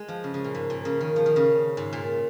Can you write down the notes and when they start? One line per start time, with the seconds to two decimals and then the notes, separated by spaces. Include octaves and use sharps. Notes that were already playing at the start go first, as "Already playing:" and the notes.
Already playing: G#3
0.08 F3
0.24 C#3
0.34 C#3
0.44 A#2
0.54 G#2
0.70 A#2
0.85 C#3
1.00 D#3
1.16 F3
1.26 D#3
1.36 C#3
1.77 G#2
1.93 A#2